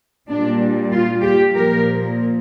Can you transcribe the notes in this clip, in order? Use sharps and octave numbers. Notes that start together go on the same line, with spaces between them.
A#2 G3 D4
F4
G4
A#2 F3 A#4